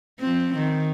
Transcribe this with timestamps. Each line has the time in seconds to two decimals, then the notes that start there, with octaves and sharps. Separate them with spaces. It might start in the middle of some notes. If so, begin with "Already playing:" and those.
0.20 F3 C4
0.58 D#3